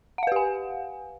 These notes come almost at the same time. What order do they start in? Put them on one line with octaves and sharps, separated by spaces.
F#5 F5 B4 G4 G#5